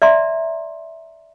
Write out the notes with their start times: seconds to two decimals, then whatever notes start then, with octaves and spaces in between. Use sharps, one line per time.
0.02 D5 E5 A#5 C6